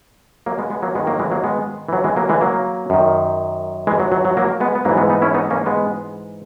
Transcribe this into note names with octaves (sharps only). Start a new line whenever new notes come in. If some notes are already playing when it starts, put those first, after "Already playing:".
F#3 A#3
G#3 B3
G#3 B3
F#3 A#3
G#2 D#3 G#3 B3
F#3 A#3
E3 G#3
F#3 A#3
G#3 B3
E3
F#3
E3 G#3
F#3 A#3
E3 G#3
F#3 A#3
F#2 D#3
E3 G#3
F#3
F#3
F#3
F#3 A#3
G#3 B3
B3
G#2 E3 F#3 A#3
G#3 B3
B3 D#4
C#4 E4
B3 D#4
A#3 C#4
G#3 B3